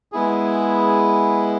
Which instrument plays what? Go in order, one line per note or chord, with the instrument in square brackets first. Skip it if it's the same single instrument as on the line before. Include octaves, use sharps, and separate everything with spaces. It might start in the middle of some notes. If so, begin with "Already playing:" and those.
[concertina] G#3 B3 E4 G#4